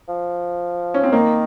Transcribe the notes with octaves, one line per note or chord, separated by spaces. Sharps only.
F3
C#4
C4
D#3 A#3